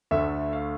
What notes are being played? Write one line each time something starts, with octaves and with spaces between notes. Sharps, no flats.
D2 D3 A3 E5
F5